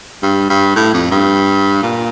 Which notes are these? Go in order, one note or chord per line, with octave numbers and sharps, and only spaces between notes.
G2
G2
A2
F2
G2
A#2